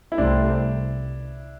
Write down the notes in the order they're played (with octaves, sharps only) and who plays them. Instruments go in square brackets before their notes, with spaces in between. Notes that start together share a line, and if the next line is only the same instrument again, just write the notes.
[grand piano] E4
[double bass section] C2 C3 A3 C4 [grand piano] D4